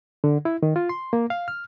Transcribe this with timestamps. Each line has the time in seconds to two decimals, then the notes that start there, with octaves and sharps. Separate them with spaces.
0.24 D3
0.45 E4
0.63 D#3
0.76 F4
0.89 C6
1.13 A#3
1.30 F5
1.48 F6